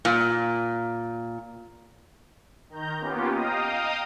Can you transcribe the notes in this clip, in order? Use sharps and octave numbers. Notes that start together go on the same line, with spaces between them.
A#2
D#3 A#5 G6
A#3 B3 C#4 F4 G4
D#5 F5 G5 A#5 D#6